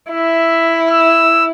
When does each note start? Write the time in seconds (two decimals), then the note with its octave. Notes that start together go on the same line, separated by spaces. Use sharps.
0.11 E4 E5
0.91 E6